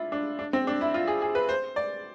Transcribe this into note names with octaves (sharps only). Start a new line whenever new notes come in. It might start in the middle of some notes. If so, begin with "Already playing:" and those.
Already playing: D4 E4 F4
D4
D4
C4
D4
E4
F4
G#4
G#4
B4
C5
D5